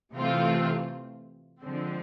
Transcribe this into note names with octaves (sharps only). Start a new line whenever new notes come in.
C3 E3 A3 C4 F4
D3 F3 G#3 C4